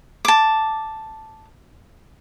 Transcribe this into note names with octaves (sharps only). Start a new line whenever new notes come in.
A5 D6